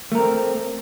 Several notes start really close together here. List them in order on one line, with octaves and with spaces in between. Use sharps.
A3 A#4 C4